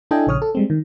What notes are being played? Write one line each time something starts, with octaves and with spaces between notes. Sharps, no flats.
D4 E4 A4 D#5 G5 G#5
A#1 C#3 C#5 D#6 F6
A4
G3 G#3 C4
D#3